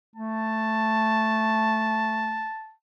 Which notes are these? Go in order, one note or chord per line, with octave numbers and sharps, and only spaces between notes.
A3 A5